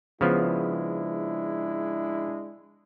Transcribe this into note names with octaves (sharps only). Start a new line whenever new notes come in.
C#3 F3 G#3 B3 D4 E4